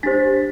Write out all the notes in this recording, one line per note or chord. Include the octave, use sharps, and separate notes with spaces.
D4 G4 C5 A6 B6